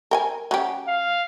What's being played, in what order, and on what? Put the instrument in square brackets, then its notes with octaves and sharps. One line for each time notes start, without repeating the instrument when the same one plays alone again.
[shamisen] A#4 G5 G#5
F#3 C#4 G4
[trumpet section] F5